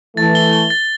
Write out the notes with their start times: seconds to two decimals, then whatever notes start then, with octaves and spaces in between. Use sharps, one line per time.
0.17 E3 A3 A6
0.35 G7
0.53 G7
0.70 A6